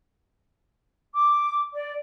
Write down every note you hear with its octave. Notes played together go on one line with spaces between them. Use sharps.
D6
D5